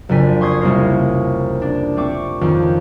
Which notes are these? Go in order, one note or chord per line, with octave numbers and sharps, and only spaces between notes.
F#1 F2 D4 G#5 B6
C6 C#6 D#6 G#6 C7
C2 A#3 C#4 A#4 C7
D4
A3 C4 C#6 D6
F2 D#3 C#4